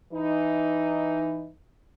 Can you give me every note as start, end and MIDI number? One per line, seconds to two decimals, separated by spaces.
0.12 1.50 52
0.12 1.50 63